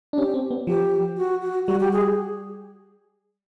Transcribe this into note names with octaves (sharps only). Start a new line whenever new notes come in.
D4
C#4 G4
C4
B3
F3 G4
F#4
F#4
G3 F#4
G4
G#4